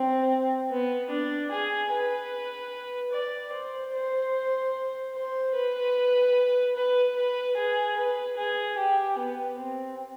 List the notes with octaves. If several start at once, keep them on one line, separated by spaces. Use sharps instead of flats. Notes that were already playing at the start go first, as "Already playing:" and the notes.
Already playing: C4
B3
D4
G#4
B4
D5
C5
C5
C5
B4
B4
B4
G#4
B4
G#4
G4
B3
C4